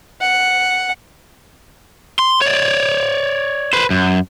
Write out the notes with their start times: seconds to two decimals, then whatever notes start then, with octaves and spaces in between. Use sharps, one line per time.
0.21 F#5
2.19 C6
2.41 C#5 D5
3.73 B4 C5
3.90 F#2